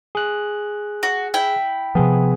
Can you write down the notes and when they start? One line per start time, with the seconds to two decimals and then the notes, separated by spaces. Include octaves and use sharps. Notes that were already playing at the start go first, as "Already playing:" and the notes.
0.15 G#4 F#6
1.03 F#4
1.34 E4 G5
1.95 C3 F3 B3 G#4